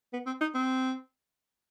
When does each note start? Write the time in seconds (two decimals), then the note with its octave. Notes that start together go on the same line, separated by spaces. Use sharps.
0.13 B3
0.26 C4
0.41 D#4
0.55 C4